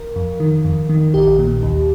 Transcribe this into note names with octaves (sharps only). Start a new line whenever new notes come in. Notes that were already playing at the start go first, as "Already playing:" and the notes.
Already playing: A#4
F2
D#3
F2
D#3
A#1 G4
A#2
D#2